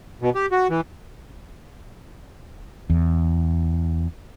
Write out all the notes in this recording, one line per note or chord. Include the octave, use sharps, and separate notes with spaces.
B2
G4
F#4
E3
E2